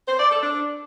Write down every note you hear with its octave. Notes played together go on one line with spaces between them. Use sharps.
C5
D5
A4
D4